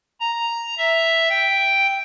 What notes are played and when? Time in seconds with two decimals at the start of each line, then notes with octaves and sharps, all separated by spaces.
0.20 A#5
0.78 E5
1.29 G5